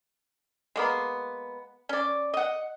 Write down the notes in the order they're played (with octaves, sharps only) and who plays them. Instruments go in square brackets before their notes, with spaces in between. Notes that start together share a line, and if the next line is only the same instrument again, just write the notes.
[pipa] G#3 A#3 B3
C#4 D5
D#5 F#5